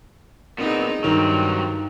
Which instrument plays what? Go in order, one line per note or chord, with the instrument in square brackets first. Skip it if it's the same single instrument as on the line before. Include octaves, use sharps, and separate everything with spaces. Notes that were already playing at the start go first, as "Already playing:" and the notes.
[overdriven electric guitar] A#2 B3 [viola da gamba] C4 D#4 G#4
[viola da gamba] G2 [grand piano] D#3 [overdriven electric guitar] F#3 C4